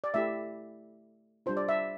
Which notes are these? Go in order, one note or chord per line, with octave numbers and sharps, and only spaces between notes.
D5
A3 E4 G4 E5
G3 D4 F4 C5
D5
E5